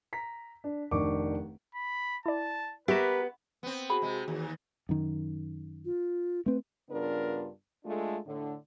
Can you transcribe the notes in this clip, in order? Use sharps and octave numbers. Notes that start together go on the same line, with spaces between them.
A#5 B6
D4
F1 D#3 D4 C#6 D6
B5
E4 D5 A5
B3 G4 A#4 B4 E5 C#6 E7
B3 C4
F#4 G#4 B5
C3 G#3
D#2 E3
F#2 D#3
F4
A3 C4 B4
G2 C#3 B3 D4 F4 A#4
G#3 A3 D4 F4 A4
A2 D3